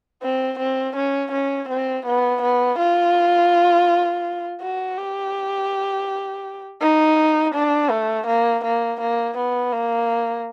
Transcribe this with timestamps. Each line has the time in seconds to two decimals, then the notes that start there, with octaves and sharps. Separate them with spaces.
0.23 C4
0.59 C4
0.96 C#4
1.32 C#4
1.69 C4
2.06 B3
2.42 B3
2.79 F4
4.61 F#4
4.97 G4
6.81 D#4
7.54 D4
7.90 A3
8.27 A#3
8.64 A#3
9.00 A#3
9.37 B3
9.73 A#3